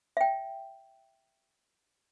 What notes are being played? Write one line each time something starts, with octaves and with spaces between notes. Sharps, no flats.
E5 G5